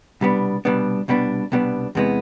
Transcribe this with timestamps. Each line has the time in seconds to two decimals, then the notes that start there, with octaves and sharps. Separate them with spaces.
0.21 C2 B2 G3 B3 D4
0.65 C2 B2 G3 B3 D4
1.08 C2 B2 G3 B3 D4
1.52 C2 B2 G3 B3 D4
1.95 E2 C3 E3 G#3 B3